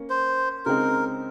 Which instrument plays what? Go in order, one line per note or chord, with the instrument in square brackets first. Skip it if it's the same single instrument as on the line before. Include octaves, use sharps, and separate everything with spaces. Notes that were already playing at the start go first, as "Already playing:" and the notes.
Already playing: [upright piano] A#3 C#4
[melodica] C5
[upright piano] C#3 G#3 C4 D#4 [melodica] A#4